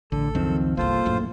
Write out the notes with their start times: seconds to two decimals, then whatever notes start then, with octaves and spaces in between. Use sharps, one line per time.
0.12 A1 D3 A4
0.35 C#2 F#2 D#3 F3 C4
0.77 G1 C2 A#3 F4 A4 C5
1.05 A#1 F#2 A2